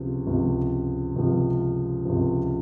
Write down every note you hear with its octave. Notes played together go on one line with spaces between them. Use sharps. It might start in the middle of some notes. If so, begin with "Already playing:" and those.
Already playing: C#2 C3 F3
C#2 C3 F3
C#2 C3 F3
C#2 C3 F3